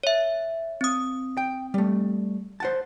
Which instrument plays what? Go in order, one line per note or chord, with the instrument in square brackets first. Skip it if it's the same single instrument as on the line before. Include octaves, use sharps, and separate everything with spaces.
[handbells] C#5 E5
C4 D#6
[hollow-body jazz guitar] G5
G3 A3
C5 F#5 A5